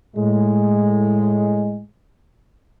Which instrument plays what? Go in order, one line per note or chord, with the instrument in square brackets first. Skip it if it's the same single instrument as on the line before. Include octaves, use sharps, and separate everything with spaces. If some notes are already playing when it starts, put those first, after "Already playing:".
[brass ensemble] A2 G#3